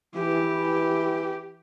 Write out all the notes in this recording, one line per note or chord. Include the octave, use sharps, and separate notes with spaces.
E3 G4